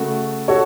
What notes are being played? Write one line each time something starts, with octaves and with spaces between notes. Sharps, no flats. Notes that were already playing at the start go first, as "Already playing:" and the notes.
Already playing: C#3 A3 F#4
F#4 A4 C#5